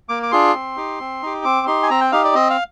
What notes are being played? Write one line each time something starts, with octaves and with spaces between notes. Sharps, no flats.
A#3 D6
D6
D4 F4 G#4 C6
C4
D#4 G4
C4
D#4 G4
C4 D6
D#4 G4 C6
G#5
C4 A#5
G5
D#4 G4 F5
D5
C4 D#5
F5